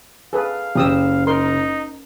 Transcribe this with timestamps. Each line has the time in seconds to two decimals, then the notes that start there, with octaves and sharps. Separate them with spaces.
0.33 G#4 A4 B4 F5
0.75 F#1 G4 D#6 E6
1.27 D#4 A#4 C6